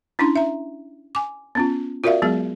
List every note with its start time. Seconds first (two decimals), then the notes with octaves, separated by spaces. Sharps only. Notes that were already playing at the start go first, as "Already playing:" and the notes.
0.19 C#4 D4 E4 C6
0.36 E5 A#5
1.15 G#5 D6
1.55 B3 C#4 F4
2.04 F4 F#4 A#4 D5 E5 F5
2.22 F#3 G#3 B3 G#4